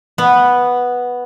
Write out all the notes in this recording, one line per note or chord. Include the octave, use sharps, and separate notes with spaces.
B3